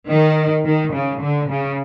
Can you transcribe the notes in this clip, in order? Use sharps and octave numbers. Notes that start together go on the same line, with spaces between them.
D#3
D#3
C#3
D3
C#3